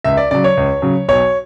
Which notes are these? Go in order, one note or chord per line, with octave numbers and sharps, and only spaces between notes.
C#2 E5
D5
C#3 F#3 D5
C#5
C#2
C#3 F#3
B1 C#5